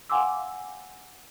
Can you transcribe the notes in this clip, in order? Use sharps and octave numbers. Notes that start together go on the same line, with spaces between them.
F5 F#5 G#5 C6 D6 E6